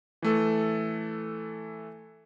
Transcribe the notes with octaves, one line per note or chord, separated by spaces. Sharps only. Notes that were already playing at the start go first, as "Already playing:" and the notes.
E3 A3 A4